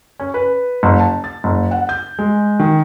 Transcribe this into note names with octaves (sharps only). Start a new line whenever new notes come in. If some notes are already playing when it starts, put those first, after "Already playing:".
C#4
B4
F#1
A5
A6
F#1
F#5
G6
G#3
D#3